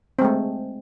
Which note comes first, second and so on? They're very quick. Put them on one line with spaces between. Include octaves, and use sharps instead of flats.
C4 G#3 A3